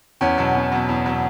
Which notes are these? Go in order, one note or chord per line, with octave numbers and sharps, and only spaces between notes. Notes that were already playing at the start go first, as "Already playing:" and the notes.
E2 C#4
B2 F#3
E2
B2 F#3
E2
B2 F#3